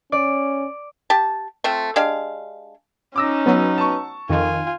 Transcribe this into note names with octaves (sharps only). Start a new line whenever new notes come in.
C#4 D5
G4 A5
A3 C4 F4
G#3 D4 G4 F5
C#4 D#4 D6 E6 A#6
F#3 B3
A5 C#6
F2 D#3 F4 G#5